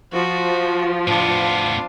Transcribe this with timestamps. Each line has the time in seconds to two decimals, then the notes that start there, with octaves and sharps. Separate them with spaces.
0.13 F3 F#4
1.08 A2 B3 D4 F4